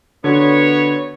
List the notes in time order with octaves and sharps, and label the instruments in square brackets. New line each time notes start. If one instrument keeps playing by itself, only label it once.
[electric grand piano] D3 F#4 [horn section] B3 C#5